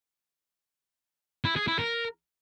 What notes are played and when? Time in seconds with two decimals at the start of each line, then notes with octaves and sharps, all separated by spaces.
1.45 E4
1.56 G#4
1.67 E4
1.79 A#4